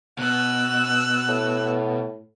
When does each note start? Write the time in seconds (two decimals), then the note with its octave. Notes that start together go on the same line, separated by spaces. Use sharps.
0.19 B2 E6 F#6
1.28 A2